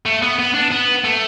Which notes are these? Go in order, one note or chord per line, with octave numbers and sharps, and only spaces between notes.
A3
B3
B3
D4
B3
A3